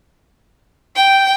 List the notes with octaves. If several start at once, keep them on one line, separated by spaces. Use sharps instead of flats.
G5